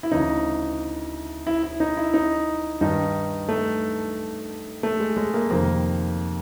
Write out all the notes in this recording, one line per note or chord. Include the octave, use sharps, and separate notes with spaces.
E4
D2 C#3 E3 D#4
E4
E4
D#4
E4
D#4
G2 D#3 D#4
A3
A3
G#3
G#3
A#3
F2 C3 D#3 A#3